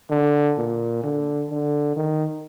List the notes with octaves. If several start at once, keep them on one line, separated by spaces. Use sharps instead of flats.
D3
A#2
D3
D3
D#3